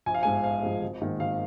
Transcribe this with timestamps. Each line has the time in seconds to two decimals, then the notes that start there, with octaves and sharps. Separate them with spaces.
0.06 A#1 G#5
0.14 F5
0.23 G#2 F3 G#3 G#5
0.44 A#1 F5
0.63 G#2 F3 G#3
0.82 G#1
1.01 G#2 D#3 A#3
1.20 G#1 F5